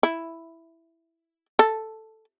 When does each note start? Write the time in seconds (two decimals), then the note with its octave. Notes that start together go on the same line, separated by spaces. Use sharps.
0.03 E4
1.59 A4